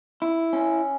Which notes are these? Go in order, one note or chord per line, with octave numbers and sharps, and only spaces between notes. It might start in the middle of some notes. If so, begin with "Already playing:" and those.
E4
C#4